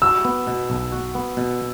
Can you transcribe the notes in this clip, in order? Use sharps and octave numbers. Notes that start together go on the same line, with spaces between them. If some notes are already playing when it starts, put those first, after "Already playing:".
F#4 E6
B3
B2
B1
F#4
B3
B2